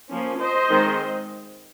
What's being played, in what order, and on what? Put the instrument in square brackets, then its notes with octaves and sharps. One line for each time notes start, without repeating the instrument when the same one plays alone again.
[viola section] F3 A#3 C#4
C5 D#5
D#3 G#3 C4